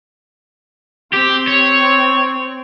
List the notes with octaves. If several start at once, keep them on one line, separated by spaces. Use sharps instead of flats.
C4 G4
C#5